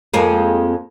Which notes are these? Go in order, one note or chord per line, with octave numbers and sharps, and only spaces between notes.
F2 G#3 A#3